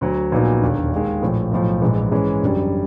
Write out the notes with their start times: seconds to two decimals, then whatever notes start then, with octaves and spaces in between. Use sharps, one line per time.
0.01 D2 D3 F#3
0.32 A#1 A#2 F#3 B3 D#4
0.61 E1 D#2 D3
0.92 D#2 D#3 G#3
1.22 A#1 A2 F3
1.52 B1 A2 F3
1.82 A#1 G#2 E3
2.12 G#2 E3 G#3 C#4
2.42 F#1 F#2 D3 G3